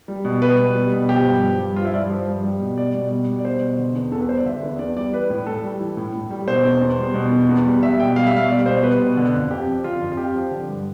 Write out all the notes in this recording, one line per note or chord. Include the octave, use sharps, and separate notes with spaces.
G3
B2
G3 B4
B2
G3
B2
F3 G4
G2
F3
G2
F3 F4
E4
G2 D5
F3
G2
G3
B2
G3 D5
B2
G3
B2
D5
G3 C5
B2
D3
E2
E2 A4
B4
G3 C5
D5
D3 E5
E2
E2 D5
G3 D5
E3 B4
A2
A2 A4
G3
E3
A2
A2
G3
B2 C5
E2
E2
G3
B2
E2
E2
G3
G3 E5
B2 G5
G3 F5
E5
B2 F5
G3 D5
B2 C5
G3 B4
B2
D3
F2
F2 G4
F3
D3 F4
F2
F4
F2 G4
F3
D3
G2